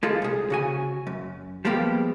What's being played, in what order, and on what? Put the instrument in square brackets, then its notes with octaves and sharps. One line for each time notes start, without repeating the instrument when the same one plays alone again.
[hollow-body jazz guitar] G#3 F4 G#4 A4
C2 G#4
C#3 F#4 G#5
F#2
F3 G3 G#3 A#3 B3 G4